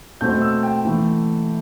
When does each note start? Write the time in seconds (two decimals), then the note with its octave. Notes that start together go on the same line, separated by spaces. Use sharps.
0.21 B2 A3 C4 G6
0.42 E6
0.63 G5
0.84 E3 A3